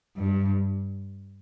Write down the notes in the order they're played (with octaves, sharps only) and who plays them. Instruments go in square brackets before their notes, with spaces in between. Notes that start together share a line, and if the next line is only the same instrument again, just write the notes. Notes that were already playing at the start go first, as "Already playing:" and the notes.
[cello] G2